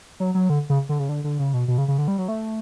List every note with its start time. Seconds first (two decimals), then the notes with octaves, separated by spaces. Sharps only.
0.20 F#3
0.35 F#3
0.50 D3
0.70 C#3
0.89 D3
0.99 C#3
1.09 D3
1.24 D3
1.39 C#3
1.54 B2
1.68 B2
1.78 C#3
1.88 C#3
1.98 D3
2.08 G3
2.18 F#3
2.28 A3